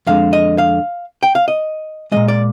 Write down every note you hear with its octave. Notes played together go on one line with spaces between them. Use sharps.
F2 D3 G#3 F5
D#5
F5
G5
F5
D#5
A#2 F3 G#3 D#5
D5